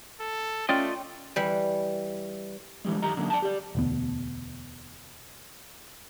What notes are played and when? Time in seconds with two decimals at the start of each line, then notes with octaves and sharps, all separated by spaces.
0.20 A4
0.69 A3 C#4 F4 D5 D#5 G5 C6
1.36 E3 G3
2.85 D3 E3 F3 G3 G#3
3.02 F#2 D#3 G4 D#5 A#5
3.17 D3 F#3 A#3 C#4 D4
3.30 D5 G5 A5
3.42 G4 D5
3.75 E1 D2 B3